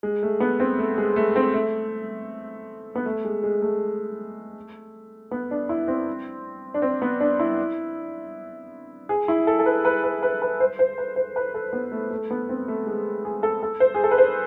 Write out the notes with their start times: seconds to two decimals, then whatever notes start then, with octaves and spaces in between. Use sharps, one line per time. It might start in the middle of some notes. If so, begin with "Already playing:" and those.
0.03 G#3
0.23 A3
0.40 B3
0.60 C4
0.79 A3
0.98 G#3
1.16 A3
1.36 C4
1.54 A3
2.95 B3
3.06 A3
3.25 G#3
3.44 G#3
3.62 A3
5.31 B3
5.51 D4
5.69 E4
5.88 C4
6.74 D4
6.82 C4
7.02 B3
7.20 D4
7.40 E4
9.09 G#4
9.28 E4
9.47 A4
9.59 A4
9.66 B4
9.85 B4
10.04 B4
10.23 B4
10.42 B4
10.60 C5
10.79 C5
10.98 B4
11.16 C5
11.36 B4
11.54 A4
11.73 B3
11.92 A3
12.11 A3
12.31 B3
12.49 C4
12.68 A3
12.87 G#3
13.25 G#4
13.43 A4
13.63 A4
13.80 C5
13.94 G#4
14.04 A4
14.11 B4
14.18 C5